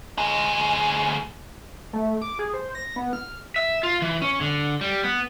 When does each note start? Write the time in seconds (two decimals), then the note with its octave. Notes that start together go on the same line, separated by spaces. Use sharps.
0.18 D2 G#4
1.93 A3
2.22 D6
2.39 G#4
2.54 C5
2.75 A#6
2.96 B3
3.13 F6
3.56 E5
3.83 F4
4.02 E3
4.22 C#4
4.41 D3
4.81 G3
5.04 B3